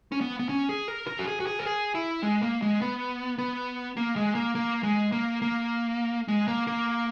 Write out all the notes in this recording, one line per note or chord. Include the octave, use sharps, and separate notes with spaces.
C#4
B3
B3
C#4
G#4
A#4
A#4
F#4
G#4
F#4
G#4
A#4
G#4
E4
G#3
A#3
G#3
B3
B3
A#3
G#3
A#3
A#3
G#3
A#3
A#3
G#3
A#3
A#3